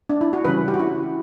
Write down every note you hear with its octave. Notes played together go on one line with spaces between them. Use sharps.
D4
E4
F#4
C#3 E3 G3 C#4 B4
G4
F#4
E4